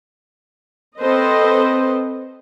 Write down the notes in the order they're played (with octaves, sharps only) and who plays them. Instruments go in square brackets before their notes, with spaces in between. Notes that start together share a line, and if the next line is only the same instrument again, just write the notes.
[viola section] C4 A4 B4 C5 D#5